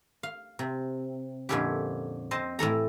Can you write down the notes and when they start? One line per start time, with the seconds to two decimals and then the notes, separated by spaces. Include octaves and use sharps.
0.23 F5
0.59 C3
1.49 F2 A#2 D3 C#4 E4 G4
2.31 C4 C5 D#5 A5
2.59 A2 E3 A4 A#5